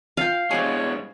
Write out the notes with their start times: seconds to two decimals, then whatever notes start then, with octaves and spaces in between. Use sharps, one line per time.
0.17 F4 F5 G5
0.51 B2 G#3 C4 G4 G#4 C#5